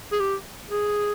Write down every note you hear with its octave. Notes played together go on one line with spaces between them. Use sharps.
G#4
G4
G#4